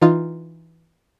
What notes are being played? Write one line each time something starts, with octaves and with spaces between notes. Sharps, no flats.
E3 D#4 F4